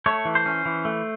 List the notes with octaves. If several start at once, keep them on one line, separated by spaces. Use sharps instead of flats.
A3 C#5
E3
C5
C#4
E3
A3